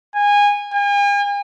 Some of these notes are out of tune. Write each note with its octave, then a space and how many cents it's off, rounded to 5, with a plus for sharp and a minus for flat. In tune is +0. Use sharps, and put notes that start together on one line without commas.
G#5 -20
G#5 -45